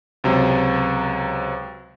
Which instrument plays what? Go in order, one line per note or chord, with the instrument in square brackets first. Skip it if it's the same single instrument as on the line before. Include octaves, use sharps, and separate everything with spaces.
[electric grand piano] C#2 C3 F#3